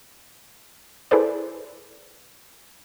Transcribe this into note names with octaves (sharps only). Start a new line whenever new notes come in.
E4 G#4 A4 B4 C5 D5